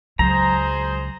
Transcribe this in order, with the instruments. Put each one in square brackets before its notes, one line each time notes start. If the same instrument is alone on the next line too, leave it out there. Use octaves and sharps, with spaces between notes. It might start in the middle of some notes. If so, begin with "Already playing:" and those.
[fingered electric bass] C#2 [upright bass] F#3 [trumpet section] G#4 C5 [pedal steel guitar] A#5